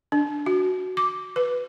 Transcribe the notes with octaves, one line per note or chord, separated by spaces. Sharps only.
D4
F#4
D6
B4